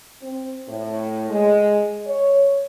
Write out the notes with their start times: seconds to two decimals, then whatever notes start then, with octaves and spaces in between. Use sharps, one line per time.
0.22 C4
0.67 A2
1.30 G#3
2.06 C#5